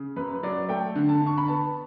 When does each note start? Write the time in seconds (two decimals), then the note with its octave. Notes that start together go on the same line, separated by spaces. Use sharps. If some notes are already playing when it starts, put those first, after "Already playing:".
Already playing: C#3
0.16 F#2 B4
0.43 F#3 D5
0.69 A3 G5
0.95 D3
1.09 A5
1.21 D3 C#6
1.38 B5
1.48 B3 A5